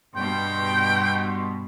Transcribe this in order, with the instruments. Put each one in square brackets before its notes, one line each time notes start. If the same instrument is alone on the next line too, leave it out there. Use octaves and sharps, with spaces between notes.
[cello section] G2 B2 [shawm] G5 [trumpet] C6